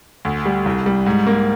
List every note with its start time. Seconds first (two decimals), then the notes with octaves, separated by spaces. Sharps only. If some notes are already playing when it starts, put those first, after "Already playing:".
0.25 D2
0.45 G3
0.66 C2
0.86 G3
1.06 G#2
1.26 A#3